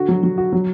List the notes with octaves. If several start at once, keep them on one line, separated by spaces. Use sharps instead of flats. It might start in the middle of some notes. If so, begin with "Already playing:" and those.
Already playing: D3 F#4
F#3
F#3
F#4
F#3